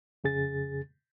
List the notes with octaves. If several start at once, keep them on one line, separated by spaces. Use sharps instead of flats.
F2 C#3 G#4 A6